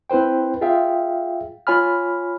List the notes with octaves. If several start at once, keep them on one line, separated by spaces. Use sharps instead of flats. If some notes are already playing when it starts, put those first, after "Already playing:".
C4 E4 B4 C5 G5
F4 G#4 E5 F5 G5
F4 C#5 G#5 B5 F6